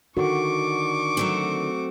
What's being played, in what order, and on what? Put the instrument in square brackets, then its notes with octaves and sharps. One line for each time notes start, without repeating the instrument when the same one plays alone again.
[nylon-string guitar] D3 D#3 [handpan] F#4 [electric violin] C#6 D6
[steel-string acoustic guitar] F#3 A3 C4